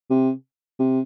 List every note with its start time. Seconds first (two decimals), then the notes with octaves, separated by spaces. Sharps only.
0.10 C3
0.79 C3